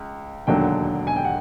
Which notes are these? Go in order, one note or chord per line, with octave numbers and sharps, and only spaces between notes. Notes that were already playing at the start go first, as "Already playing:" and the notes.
Already playing: C#2
E1 D#2 D3 F#3 G5
G#5
G5
F#5